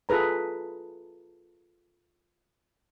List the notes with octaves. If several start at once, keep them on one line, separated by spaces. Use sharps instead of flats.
F4 G#4 A4 B4 A#5